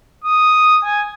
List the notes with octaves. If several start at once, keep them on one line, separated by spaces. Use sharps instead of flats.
D#6
G#5